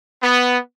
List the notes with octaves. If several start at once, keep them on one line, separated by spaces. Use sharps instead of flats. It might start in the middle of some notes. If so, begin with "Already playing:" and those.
B3